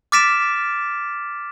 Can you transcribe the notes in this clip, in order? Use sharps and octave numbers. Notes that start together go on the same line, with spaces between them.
D6 F6 A6 B6 D7 E7